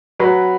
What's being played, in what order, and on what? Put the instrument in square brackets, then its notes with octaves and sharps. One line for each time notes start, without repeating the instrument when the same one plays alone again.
[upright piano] F#3 [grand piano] B4 B5